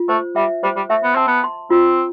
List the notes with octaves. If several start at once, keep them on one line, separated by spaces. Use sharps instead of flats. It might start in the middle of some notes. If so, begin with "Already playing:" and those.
Already playing: F4
A3 C5
G3 E5
G3 C5
G3
A3 E5
B3
C4 A5
B3
C6
C4 F4